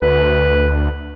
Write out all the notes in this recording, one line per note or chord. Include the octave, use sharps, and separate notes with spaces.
D2 B4